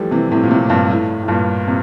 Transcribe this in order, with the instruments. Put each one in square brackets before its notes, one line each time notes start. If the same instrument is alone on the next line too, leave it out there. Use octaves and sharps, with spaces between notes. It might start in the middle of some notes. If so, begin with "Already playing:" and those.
Already playing: [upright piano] E3 F3 G3 A3
C3 E3
A2 C3
A#2
A2 C3
G2 A#2
A2
A2
G2 A#2
C3